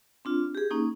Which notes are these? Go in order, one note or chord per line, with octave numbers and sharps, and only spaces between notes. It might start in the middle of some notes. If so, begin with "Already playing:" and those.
C4 D4 F4
G4 G#4
A#3 C#4 D#4